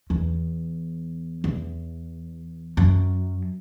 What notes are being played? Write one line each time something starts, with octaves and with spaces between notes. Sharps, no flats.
E2
E2
F#2